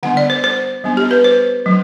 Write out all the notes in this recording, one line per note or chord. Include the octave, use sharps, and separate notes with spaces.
D3 G3 B3 D4 F#5
D5
C5
C5
G3 B3 D4
G4
B4
C5
F#3 A3 D4